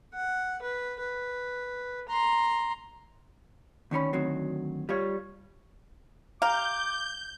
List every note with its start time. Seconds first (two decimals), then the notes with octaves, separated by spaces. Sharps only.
0.14 F#5
0.62 B4
0.99 B4
2.09 A#5 C6
3.91 D2 D#3 C#4 B5
4.13 D2 D#3 F#3 C4
4.89 G3 F4 C#5
6.42 G4 F5 A#5 D6 G6